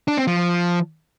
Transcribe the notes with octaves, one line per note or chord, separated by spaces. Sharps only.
D4
C4
F3